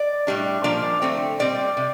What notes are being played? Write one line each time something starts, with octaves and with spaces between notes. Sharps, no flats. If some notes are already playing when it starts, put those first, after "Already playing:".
Already playing: D5
A2 G3 D4
A#2 F3 A#3 D4 D5
D3 A3 C4
A#2 G3 C4 D5
C3